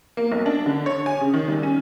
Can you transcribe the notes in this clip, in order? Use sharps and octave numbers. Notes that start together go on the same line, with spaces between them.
A#3
B1
D4
D3
C#5
G#5
C#3
D#3
C2
C#4